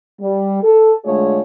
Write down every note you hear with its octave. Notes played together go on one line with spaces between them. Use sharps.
G3
A4
D3 G#3 A3 F4 G#4 C#5